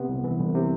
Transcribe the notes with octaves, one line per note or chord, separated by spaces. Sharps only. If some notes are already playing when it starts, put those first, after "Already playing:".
Already playing: C3 B3
C2
E3
C2
C3